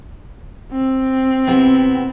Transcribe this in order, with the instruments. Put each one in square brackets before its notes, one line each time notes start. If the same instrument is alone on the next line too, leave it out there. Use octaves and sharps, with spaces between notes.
[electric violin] C4
[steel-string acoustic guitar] C3 B3 E4